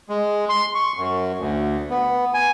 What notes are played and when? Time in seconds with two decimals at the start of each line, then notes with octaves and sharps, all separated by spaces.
0.09 G#3
0.49 C6
0.75 C#6
0.97 F#2
1.39 D2
1.90 B3
2.34 G#5